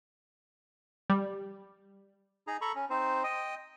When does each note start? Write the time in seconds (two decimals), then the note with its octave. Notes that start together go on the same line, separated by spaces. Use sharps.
1.10 G3
2.47 D#4 G#4 A#5
2.61 A4 A#5 B5 C#6
2.75 C#4
2.90 C4 D#4 C5
3.24 D#5 G5 D#6